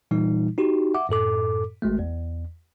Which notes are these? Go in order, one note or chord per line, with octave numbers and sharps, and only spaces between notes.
A#2 E3 G3 D#4
D#4 F#4 G4
E5 F#5 D6
F#2 A2 A4 D6
G#1 G#3 A3
E2